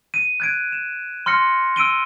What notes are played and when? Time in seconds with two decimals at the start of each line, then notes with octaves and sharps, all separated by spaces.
0.14 D#7
0.40 F#6 G#6 D7
0.73 E7
1.26 C6 F6 A#6 C#7
1.76 E6 D7 D#7 G7